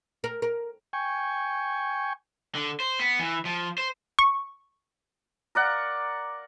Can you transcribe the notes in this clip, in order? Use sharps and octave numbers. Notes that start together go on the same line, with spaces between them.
A#4
A#4
G5 G#5 C#6
D3
C5
B3
E3
F3
C5
C#6
A#4 D5 F#5